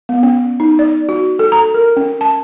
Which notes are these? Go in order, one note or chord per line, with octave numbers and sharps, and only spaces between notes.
B3
C#4
D#4
D5
F#4
A4
A#5
A#4
C#4
A5